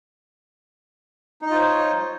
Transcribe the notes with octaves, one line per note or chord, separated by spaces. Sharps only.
D#4 F4 C5 C#5 D#5